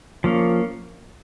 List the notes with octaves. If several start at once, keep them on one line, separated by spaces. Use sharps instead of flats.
F3 A#3 C#4